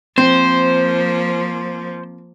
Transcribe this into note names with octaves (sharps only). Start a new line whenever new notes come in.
F3 A#3 C4 C5